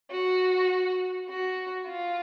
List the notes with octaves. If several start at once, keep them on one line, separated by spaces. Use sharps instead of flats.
F#4
F#4
F4